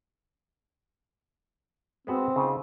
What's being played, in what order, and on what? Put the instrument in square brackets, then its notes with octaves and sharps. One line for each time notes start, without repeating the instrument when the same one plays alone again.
[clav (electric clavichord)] G#3 B3 F#4 [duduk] C4
[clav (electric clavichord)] C#3 D#4 F4